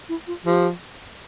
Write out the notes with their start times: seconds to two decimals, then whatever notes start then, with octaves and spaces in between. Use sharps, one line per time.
0.09 E4
0.27 F4
0.45 F3 G4